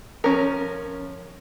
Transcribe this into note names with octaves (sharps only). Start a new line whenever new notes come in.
F3 C#4 A#4